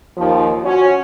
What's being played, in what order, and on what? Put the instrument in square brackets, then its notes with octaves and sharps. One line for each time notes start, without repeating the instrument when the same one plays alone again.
[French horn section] D#2 F3
C#4 F#4